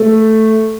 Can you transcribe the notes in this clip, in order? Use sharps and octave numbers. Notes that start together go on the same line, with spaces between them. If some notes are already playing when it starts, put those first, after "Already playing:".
Already playing: A3